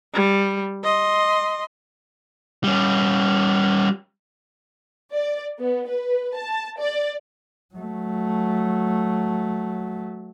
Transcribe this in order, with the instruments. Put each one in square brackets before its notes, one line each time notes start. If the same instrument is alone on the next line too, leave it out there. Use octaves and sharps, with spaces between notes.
[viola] G3
D#5 C6
[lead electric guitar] G3 C#4
[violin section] D5
B3
B4
A5
D5
[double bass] F#3 A3